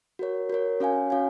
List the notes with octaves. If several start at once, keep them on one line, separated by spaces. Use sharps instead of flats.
F#4 A#4 C#5
F#4 A#4 C#5
C#4 F#4 C#5 F5 G#5
C#4 F#4 C#5 F5 G#5